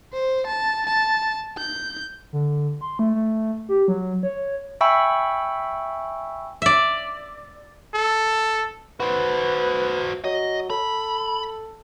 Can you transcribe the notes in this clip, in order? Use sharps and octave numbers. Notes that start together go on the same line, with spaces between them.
C5
A5
A5
G6
D3
C6
A3
A3
G4
F#3
C#5
E5 G5 G#5 B5 C#6 E6
D5 E5
A4
F#4 B4 C5
F#3 D#5
A4 B5